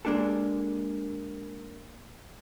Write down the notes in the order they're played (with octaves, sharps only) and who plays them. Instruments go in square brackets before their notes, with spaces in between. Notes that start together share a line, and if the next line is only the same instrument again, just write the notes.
[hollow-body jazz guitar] G#3 A#3 D4 G4 A4